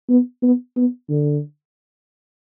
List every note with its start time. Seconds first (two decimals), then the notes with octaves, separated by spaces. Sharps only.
0.09 B3
0.43 B3
0.76 B3
1.09 D3